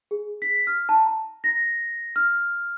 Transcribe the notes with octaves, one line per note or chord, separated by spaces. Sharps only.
G#4
B6
F6
A5
A#5
A#6
F6